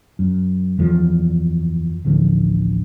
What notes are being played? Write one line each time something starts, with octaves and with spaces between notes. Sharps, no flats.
F#2
F#1 E2 F3
D1 A1 D3 F3